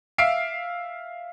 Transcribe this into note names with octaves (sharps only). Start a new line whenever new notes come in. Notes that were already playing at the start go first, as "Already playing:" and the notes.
E5 F5 C7 D7